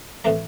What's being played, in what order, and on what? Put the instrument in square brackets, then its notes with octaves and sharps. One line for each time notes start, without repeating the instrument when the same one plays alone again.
[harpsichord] A2 E3 A3 C4 A#5